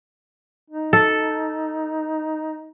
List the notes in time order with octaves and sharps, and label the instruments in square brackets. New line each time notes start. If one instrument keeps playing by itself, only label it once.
[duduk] D#4
[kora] A4